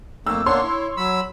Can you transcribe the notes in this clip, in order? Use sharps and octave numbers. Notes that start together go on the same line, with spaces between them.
F2 A3 A#3 E6
A#3 B3 D4 C#5 C6
E4
F#3 B5 E6